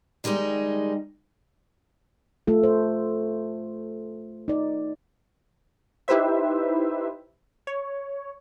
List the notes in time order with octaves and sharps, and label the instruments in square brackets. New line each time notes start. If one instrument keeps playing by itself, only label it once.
[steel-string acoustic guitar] D#3 G3 G#3 D4 D#4
[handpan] A3 F4 A4
C5
D#4 D5
[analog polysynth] D#4 E4 G4 B4 C5 E5
C#5